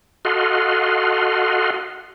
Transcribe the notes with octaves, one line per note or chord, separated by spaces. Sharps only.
F#4 A4 D#5 F5 F#5 C6